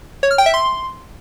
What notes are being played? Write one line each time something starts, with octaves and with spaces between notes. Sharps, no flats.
C#5
F6
G5
E5
C6